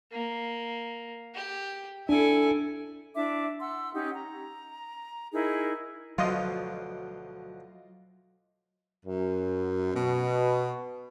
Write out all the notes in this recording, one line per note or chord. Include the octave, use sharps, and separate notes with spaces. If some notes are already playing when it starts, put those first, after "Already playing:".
A#3
G4
D4 E4 A4 G#5
D4 E4 E5 D6
F#5 C6 E6
C#4 D#4 G4 F#5
A#5
D#4 E4 G#4 A#4
D2 B2 F3 F#3 F4 D#5
F#2
B2